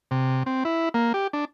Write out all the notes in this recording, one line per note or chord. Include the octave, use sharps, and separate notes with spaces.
C3
C4
E4
A#3
G4
D4